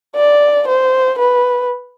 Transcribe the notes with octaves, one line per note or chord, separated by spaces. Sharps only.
D5
C5
B4